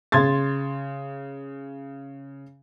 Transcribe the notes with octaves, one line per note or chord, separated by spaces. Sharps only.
C#3 C6 G#6 A6